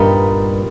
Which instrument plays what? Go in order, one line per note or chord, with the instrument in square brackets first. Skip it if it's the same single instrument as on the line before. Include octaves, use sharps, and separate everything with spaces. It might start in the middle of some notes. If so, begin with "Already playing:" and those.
Already playing: [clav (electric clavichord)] G2 [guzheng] A#2 G3 B3 D#4